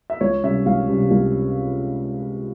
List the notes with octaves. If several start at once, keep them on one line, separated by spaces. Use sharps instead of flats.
E5
C#2 C#5
C3 G3 C#4 E5
C#2 F5
C3 G3 C#4
C#2